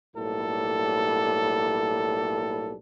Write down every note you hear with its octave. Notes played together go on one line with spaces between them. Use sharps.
B1 A2 G3 A#3 A4